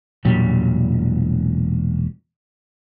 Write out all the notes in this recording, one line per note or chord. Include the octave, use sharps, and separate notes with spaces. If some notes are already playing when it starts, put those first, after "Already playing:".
E1 A#2 F#3 G3